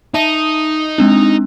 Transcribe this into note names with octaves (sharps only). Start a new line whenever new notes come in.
D#4 E5 A5 D#7
G#3 C4 D4